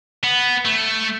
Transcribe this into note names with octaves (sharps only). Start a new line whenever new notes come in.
B3
A3